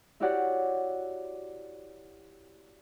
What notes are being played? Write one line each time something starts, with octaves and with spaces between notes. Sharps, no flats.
E4 F#4 G4 C#5 D5 F#5